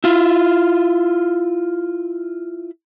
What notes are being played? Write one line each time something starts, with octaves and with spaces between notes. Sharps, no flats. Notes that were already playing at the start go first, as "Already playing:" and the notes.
E4 F4